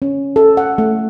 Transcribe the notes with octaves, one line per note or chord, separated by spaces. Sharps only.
C#4
A4
F#5
A3